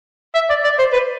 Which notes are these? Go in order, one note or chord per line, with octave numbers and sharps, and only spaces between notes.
E5
D5
D5
C5
B4